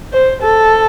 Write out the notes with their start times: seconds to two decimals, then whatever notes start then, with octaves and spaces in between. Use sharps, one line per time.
0.13 C5
0.42 A4